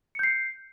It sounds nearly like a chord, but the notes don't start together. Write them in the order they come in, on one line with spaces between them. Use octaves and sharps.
C#7 G6 C7